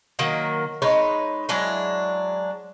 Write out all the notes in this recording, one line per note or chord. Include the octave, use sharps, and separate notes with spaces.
D#3 F#3 A#3
G#3 D#4 B4 C#5
F#3 G#3 D4 E4